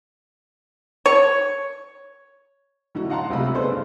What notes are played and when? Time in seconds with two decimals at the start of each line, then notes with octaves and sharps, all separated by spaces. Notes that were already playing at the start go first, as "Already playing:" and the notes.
1.06 C#5
2.95 A2 D3 D#4 F#4
3.10 D#5 F5 F#5 A5 A#5 C6
3.30 C#2 C3 A3 F4 D#5 B5
3.54 B3 D4 D#4 G#4 A4 C5
3.70 G2